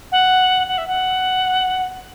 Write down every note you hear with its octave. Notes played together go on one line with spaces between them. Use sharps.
F#5
F#5
E5
F#5